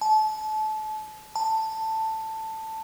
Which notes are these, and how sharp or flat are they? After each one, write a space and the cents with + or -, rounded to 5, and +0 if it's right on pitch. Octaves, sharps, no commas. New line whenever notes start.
A5 -30
A5 +10